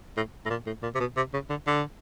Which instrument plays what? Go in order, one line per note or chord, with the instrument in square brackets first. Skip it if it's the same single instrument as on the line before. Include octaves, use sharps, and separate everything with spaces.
[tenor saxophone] A2
A2
A#2
A2
A#2
C3
B2
C3
C#3
D3
D3